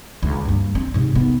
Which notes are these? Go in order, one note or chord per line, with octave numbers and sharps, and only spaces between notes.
C#2
G2 A#3
C4
G#2 C3
D#2 B3